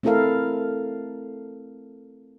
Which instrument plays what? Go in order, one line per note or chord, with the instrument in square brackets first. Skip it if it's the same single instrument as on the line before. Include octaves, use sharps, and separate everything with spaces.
[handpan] A3 C4 E4 A4 A#4 F5